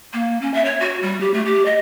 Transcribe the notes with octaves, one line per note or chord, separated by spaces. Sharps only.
A#3
C#4
E5
C#5
F#4
G3
G4
A3
G4
D#5